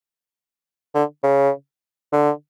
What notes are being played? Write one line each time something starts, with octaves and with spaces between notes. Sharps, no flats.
D3
C#3
D3